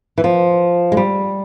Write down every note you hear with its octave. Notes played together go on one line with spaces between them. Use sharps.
E3
F3
G#3
G3